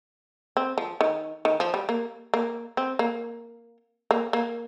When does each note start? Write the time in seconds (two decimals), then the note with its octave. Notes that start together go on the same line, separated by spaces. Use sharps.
0.57 C4
0.78 F3
1.01 D#3
1.45 D#3
1.60 F3
1.74 G3
1.89 A#3
2.34 A#3
2.77 C4
2.99 A#3
4.11 A#3
4.33 A#3